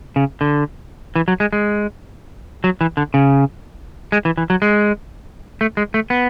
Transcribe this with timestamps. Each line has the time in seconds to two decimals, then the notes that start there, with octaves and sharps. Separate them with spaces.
0.16 C#3
0.41 D3
1.16 E3
1.28 F#3
1.40 G#3
1.53 G#3
2.64 F#3
2.81 E3
2.97 D3
3.14 C#3
4.12 G#3
4.25 E3
4.37 E3
4.50 F#3
4.62 G#3
5.61 A3
5.77 G#3
5.94 A3
6.10 B3